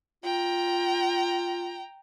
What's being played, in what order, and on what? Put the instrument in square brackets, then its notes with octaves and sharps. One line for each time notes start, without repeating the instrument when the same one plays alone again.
[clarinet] F4 [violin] G5 A#5